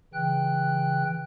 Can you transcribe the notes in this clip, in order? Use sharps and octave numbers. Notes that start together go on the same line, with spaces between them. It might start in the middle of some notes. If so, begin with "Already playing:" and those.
C#3 E3 G5 F#6